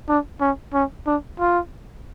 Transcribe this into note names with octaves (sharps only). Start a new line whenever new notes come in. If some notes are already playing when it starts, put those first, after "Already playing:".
D4
C#4
C#4
D4
F4